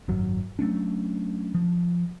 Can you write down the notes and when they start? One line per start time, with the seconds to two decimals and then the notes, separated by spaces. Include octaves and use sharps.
0.08 G#1 F#2 F#3
0.59 F#3 A3 C#4 D4
1.55 F3